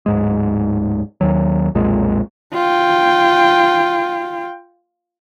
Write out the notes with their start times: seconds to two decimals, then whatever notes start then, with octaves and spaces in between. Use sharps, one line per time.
0.06 D1 G#2 G#3
1.21 D#2 D#3 F#3
1.75 B1 F2 A#2 G#3
2.53 F4 G5